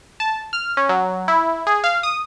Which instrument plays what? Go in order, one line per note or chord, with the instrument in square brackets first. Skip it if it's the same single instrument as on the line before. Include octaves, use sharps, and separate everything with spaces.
[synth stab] A5
F6
C#4
F#3
E4
G#4
F5
D#6